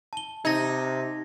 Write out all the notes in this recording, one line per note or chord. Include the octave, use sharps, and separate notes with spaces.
A5 G7
C3 D#4 G#6 A#6